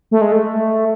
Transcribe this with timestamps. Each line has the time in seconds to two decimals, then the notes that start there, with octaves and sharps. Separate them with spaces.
0.11 A3
0.21 G#3
0.32 A3